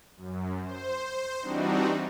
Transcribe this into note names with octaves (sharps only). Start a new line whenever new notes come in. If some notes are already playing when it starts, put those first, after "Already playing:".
F#2
C5
E3 G3 C4 D4 D#4 F#4